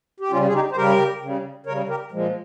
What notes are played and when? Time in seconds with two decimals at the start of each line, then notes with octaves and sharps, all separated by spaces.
0.20 G4
0.31 C#3 G3 C#4 F4
0.47 G#4
0.53 D#4 G4
0.72 C5
0.76 C#3 G3 G4 A#4
1.22 C#3 G3
1.66 C#3 A#4 C#5
1.70 G3
1.89 G4 A#4
2.11 A#2 F3 G#3